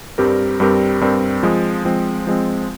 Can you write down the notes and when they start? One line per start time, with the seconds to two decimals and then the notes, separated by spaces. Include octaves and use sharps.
0.18 G2 G3 C4 G4 A#4
0.60 G2 G3 C4 G4 A#4
1.01 G2 G3 C4 G4 A#4
1.43 F3 G#3 C4
1.85 F3 G#3 C4
2.27 F3 G#3 C4